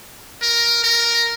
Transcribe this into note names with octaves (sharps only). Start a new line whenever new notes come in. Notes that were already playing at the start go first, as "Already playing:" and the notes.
A#4
A#4